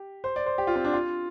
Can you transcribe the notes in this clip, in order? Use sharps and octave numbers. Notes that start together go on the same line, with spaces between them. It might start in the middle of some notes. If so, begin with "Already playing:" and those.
Already playing: G4
C5
D5
C5
G4
F4
C4
D4
F4